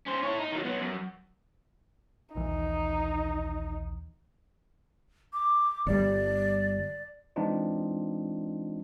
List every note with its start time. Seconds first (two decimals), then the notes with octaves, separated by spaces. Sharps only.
0.07 C#4 C5
0.23 E4 C#5
0.39 D#4
0.52 D#3 F#3
0.65 F#3 B3
0.81 F#2
2.35 A#1 D#2 E3 D#4
5.33 D6
5.87 G1 G3 D5
7.36 E3 G#3 C4 D4 D#4 F4